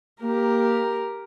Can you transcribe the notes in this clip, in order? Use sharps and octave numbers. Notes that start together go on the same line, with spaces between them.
A#3 G4 A#4